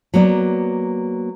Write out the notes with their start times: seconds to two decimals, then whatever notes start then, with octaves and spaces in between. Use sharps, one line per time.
0.14 F#3 A#3 B3 D5